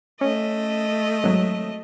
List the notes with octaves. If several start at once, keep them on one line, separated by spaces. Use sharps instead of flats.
A3 C#4 D#5
G#1 F#3